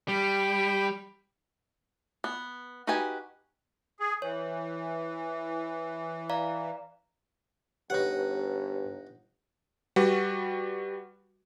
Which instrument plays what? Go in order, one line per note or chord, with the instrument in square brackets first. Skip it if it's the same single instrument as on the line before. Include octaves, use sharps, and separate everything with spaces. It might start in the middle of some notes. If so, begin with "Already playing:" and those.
[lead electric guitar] G3 [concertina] G5 B5
[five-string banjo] B3
D#4 F#4 G4 B4 G#5
[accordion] G#4
[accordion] E3 [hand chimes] C#5
[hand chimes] D5 F5 A#5
[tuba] G1 [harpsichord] D#4 F#5 [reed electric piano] G4 B4 C#5
[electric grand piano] G3 F#4 B4